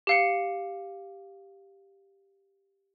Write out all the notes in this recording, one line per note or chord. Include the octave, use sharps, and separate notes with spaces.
G4 F5 C#7